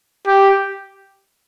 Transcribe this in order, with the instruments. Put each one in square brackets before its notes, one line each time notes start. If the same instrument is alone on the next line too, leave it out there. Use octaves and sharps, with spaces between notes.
[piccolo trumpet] G4